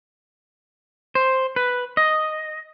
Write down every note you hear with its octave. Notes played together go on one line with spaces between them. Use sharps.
C5
B4
D#5